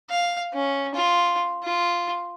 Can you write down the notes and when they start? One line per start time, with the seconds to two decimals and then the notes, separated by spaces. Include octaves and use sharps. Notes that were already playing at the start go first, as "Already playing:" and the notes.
0.10 F5
0.54 C#4
0.95 F4
1.64 F4